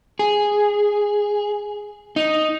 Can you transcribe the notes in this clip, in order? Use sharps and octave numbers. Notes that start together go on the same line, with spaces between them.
G#4
D#4